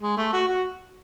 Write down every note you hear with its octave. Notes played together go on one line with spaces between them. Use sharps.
G#3
A3
F#4
F#4